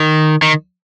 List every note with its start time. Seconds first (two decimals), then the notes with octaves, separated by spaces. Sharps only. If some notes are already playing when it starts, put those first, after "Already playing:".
Already playing: D#3
0.42 D#3